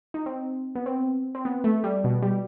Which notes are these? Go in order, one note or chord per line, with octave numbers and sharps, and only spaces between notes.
D#4
C4
B3
C4
C4
B3
A3
G3
B2
G3